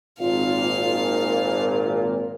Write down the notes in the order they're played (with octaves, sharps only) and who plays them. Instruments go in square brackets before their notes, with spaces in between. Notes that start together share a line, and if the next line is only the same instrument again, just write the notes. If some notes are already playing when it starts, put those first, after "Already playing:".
[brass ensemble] G#1 A#2 [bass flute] F4 [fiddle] F5
[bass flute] A#4